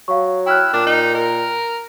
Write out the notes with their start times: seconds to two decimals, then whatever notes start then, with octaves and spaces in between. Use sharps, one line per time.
0.08 F#3 F5 C#6
0.46 E4 G5 F6 F#6
0.73 A#2 D4
0.87 D#4
1.15 A#4